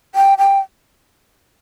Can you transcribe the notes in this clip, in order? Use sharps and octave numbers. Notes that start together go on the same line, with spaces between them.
G5
G5